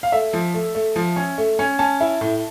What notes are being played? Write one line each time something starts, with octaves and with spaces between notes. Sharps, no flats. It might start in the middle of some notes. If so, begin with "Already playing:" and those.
F5
A3 E5
F3
A3
A3
F3
C#4
A3
C#4
C#4 A5
E4
A2